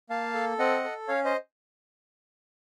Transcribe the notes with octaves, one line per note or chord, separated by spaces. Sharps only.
A#3 F5 A5
A4
C4 D#5 F#5
A4
C#4 C#5 F5
C5 D#5